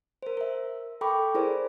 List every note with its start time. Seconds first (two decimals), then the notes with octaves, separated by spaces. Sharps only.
0.23 A#4 C5
0.37 A#4 E5
1.01 A4 G5 B5 C#6 D6
1.34 E4 G#4 A#4 C5 D5